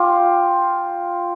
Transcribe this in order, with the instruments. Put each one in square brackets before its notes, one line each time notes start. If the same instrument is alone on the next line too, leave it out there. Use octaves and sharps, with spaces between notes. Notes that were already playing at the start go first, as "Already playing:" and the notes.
Already playing: [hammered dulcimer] F4 G4